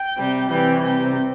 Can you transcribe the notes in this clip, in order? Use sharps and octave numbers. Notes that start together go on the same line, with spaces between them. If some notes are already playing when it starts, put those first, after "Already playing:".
Already playing: G5
C3 G3
C3 E3 G3 G5
C3 G3 G5